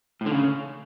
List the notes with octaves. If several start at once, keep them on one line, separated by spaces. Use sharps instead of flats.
A2
D3
C#3